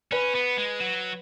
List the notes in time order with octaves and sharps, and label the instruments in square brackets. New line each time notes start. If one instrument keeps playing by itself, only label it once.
[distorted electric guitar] C#4 [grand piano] B4
[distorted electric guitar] B3
G#3
F#3